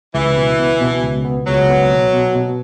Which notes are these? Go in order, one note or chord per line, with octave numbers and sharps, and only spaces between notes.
C#2 E3
B2
B3
B2
C#2
B3
C#2 F#3
B3
B2
B2
B2